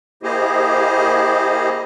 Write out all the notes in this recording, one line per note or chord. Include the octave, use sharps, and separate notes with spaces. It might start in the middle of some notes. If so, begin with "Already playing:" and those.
A#3 E4 G4 G#4 C5 D#5